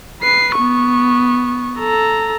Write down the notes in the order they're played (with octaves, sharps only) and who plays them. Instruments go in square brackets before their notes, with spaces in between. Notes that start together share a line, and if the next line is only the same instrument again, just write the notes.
[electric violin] B4 C7
B3 C#6
A4 A#5